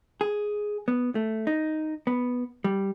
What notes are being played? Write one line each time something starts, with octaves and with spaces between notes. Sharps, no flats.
G#4
B3
A3
D#4
B3
G3